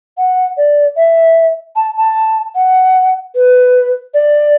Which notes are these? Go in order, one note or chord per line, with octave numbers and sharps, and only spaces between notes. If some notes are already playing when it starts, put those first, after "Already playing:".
F#5
D5
E5
A5
A5
F#5
B4
D5